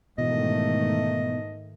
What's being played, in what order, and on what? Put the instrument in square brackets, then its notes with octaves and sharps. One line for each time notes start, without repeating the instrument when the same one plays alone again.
[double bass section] G#2 D#3 A3 [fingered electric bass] B2 E3 [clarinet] D#5